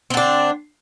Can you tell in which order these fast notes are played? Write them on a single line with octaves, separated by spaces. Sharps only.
C4 D3 D4